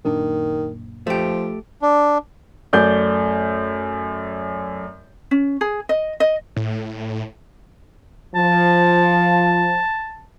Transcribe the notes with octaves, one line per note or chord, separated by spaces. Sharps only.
F#1 A#2 D#3 D4
F3 A3 G4
D4
F#2 A3 D5 G6 G7
C#4
G#4
D#5
D#5
A2
F3 A5